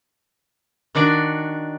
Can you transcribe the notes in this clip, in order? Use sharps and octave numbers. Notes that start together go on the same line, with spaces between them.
D#3 D4 F#4 D5